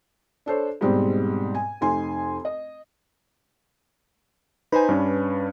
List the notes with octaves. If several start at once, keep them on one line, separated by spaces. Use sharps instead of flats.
D4 A4 C5 C#5
G#2 B2 G3 G#3 C4
G#5
F1 D#4 G#5 C6
D#5
D#4 B4 C5 G#5 B5
G2 C#4 D4